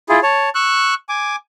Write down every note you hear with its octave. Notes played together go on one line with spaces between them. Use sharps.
E4 F4 G#4
C#5 A5
C#6 E6 F#6
G#5 D6